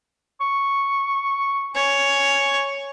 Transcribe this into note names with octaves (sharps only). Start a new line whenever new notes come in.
C#6
C#5 G#5